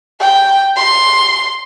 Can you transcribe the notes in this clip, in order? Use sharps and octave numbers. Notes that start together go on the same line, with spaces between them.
G5
C6